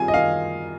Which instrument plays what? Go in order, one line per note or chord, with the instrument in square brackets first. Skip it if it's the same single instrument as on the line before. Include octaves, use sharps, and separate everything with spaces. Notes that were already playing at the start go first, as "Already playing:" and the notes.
Already playing: [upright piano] D#3 G3 C4 F4 G#4 [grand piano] G#5
[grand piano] D#5
[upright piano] D#3 [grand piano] F5